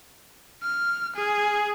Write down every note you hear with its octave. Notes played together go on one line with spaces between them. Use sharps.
F6
G#4